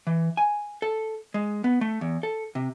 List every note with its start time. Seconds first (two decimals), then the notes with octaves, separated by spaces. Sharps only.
0.07 E3
0.37 G#5
0.82 A4
1.34 G#3
1.64 B3
1.81 A3
2.01 E2
2.23 A4
2.55 C3